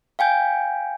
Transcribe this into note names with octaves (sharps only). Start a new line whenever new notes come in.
F5 G5 G#5 G6